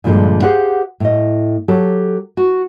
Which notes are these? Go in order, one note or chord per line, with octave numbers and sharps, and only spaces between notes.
G2 A#2 D3 F3 G#3 A4
G4 G#4 C5 F5 F#5
A2 D#5
F#3 G4 A4
F#4